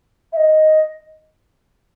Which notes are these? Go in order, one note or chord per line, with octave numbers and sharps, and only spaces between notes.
E5
D#5